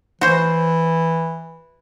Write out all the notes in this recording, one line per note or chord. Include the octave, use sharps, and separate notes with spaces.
E3 F#4 C5